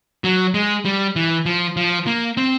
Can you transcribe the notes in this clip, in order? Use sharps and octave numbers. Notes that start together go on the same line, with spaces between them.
F#3
G#3
G3
E3
F3
F3
A#3
C4